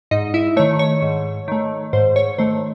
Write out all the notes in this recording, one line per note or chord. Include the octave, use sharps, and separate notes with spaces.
G#2 D#4 D#5
E4 E5
D#3 A3 C#5
C#5
G#2
D#3 A3
G#2 C5
C#5
D#3 A3 C5